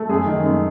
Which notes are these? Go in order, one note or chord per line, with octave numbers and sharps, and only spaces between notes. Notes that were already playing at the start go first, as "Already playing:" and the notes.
Already playing: A3
F#2 G#4
D#3
F#2